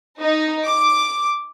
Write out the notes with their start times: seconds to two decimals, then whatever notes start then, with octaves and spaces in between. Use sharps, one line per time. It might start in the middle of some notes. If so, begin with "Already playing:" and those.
0.21 D#4
0.66 D6